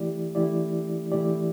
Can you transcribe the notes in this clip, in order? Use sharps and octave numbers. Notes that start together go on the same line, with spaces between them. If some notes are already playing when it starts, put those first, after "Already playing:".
Already playing: E3 A3 E4 G4 D5
E3 A3 E4 G4 D5
E3 A3 E4 G4 D5